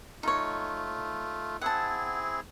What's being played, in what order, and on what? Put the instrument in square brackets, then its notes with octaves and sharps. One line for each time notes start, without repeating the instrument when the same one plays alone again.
[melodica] A3 F4 [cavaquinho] D#4 C#5
[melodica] C4 E4 G#4 [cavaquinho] F#5 A5